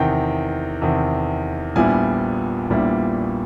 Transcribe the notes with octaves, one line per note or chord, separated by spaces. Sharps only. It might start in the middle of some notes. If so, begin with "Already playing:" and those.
Already playing: E2 C3 D#3 G5
E2 C3 D#3
A#1 A#2 G3 B3 E4 G#5
A#1 A#2 G3 B3 E4